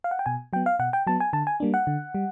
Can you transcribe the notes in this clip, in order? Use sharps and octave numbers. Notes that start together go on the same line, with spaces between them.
F5
F#5
G5
B2 G#5
F#3 B3 G5
F5
B2 F#5
G5
F#3 B3 A5
G#5
D3 A5
G#5
G3 A#3 D4
F#5
D3
G3